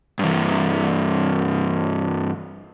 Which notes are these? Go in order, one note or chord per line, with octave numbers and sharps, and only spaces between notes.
G2 E3